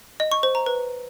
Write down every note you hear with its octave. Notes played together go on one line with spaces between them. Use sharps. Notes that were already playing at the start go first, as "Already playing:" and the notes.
D#5
C#6
C5
A#5
B4